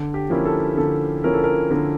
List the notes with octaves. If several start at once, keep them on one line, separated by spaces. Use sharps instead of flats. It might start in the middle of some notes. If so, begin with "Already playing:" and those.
Already playing: D3
G4
F3 A#3 C#4 E4
A4
D3 A4
F3 A#3 C#4 E4 A#4
A4
A#4
D3 A#4